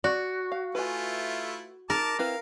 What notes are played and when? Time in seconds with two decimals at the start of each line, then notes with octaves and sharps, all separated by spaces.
0.04 F#4 D5
0.52 F5
0.75 A3 E4 F4 B4 G#5
1.90 D#4 A#4 A5 D6
2.19 C4 E4 B4 F5